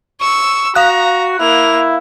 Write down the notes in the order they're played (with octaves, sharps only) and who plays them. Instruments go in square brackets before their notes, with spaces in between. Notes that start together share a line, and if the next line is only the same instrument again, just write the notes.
[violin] C#6 E6
[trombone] F#4 [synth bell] F5 F#6 [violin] A#5
[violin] A#3 F7 [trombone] E4